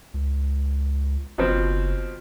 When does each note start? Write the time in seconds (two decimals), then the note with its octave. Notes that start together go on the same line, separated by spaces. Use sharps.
0.14 C#2
1.38 F#1 B2 F3 C4